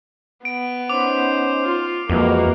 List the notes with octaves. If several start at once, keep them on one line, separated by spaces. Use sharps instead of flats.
B3 D7
C#4 D#4 C5 D6
F4
F2 E3 G#3 A#3 F#4